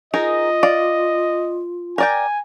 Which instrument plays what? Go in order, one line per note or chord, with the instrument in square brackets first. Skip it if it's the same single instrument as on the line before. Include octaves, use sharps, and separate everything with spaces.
[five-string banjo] D#4 G#4 A#4 [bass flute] F4 [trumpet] D#5
[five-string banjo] D5 F5
[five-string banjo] A#4 D5 G5 [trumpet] G#5